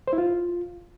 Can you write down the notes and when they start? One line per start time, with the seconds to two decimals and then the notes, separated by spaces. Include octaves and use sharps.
0.08 C5
0.13 E4
0.18 F4